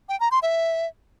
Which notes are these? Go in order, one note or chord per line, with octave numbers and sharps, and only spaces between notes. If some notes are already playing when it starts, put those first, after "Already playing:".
G5
A#5
C6
E5